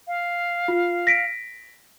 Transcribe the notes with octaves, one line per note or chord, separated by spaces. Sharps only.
F5
F4
A#6 B6 D7